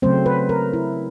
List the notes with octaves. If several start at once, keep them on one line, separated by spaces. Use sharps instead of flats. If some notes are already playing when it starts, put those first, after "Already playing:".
C#3 F#3 A3 C4 C5
B4
A#4
E4